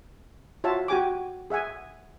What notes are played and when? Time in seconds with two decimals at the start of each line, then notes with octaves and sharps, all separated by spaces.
0.64 F4 F#4 C#5 E5 A5
0.88 F#4 G4 G#5 D6
1.50 G#4 E5 F#5 G#5